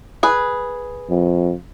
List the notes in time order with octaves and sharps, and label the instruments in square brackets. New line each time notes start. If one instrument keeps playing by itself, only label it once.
[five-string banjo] G#4 B4
[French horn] F2